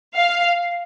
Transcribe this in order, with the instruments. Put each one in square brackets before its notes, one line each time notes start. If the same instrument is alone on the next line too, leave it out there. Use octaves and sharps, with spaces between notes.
[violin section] F5